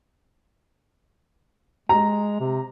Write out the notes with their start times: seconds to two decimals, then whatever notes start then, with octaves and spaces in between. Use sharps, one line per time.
1.89 G#3 A#5
2.40 C3